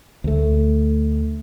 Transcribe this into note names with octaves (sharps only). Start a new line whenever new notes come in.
D2 A3